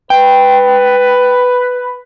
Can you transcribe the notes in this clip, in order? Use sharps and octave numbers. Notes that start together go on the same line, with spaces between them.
B4 G5